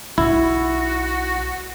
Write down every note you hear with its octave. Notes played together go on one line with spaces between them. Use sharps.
B1 E4 F#4